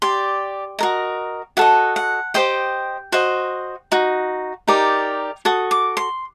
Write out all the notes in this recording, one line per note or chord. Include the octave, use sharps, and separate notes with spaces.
G4 D5 C6
F#4 A#4 D#5
F#4 A4 D#5 F#5
F#5
G4 C5 D#5 G5
F#4 C5 D#5
D#4 F#4
D#4 G4 A#4 D5
F#4 A4 D#6
D6
C6